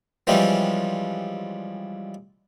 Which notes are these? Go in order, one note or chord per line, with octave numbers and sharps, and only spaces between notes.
E3 F3 G3 G#3 C4 C#4